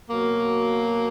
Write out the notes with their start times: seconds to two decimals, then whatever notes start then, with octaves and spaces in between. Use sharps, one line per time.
0.10 B2 F#3 A#3